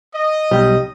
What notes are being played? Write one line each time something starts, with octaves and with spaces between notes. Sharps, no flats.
D#5
B1 G3 G5